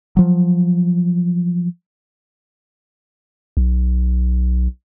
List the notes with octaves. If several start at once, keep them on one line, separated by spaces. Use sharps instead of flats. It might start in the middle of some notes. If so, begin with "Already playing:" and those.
F3 F#3
B1